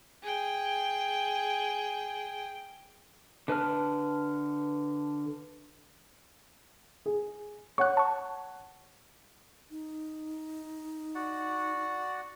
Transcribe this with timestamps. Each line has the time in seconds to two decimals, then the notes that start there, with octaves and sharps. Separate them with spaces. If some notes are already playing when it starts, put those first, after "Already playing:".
0.23 G#4 G5
3.48 D3 B4 A5 F6
7.06 G#4
7.78 C#5 F#5 C#6 F#6
7.97 A5 C#6
9.71 D#4
11.15 F#4 D5 F#5